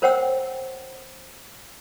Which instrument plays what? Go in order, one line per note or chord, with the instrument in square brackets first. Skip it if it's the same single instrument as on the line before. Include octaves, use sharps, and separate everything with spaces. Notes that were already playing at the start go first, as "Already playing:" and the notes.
[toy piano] A#4 C5 C#5 F#5 G5 E6